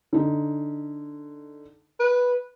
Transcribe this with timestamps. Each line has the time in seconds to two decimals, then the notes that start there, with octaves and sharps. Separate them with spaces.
0.13 D3 D#4
2.00 B4